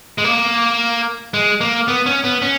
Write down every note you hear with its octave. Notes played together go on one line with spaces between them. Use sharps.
G#3
A#3
G#3
A#3
B3
C#4
B3
C#4